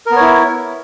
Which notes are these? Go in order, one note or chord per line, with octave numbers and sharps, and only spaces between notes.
B3 E4 A#4 C#5